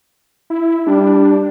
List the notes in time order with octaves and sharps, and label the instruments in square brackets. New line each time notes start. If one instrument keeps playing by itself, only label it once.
[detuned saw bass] E4
[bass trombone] G3 [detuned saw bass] D4